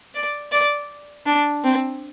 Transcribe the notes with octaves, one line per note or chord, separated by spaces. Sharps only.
D5
D5
D4
C4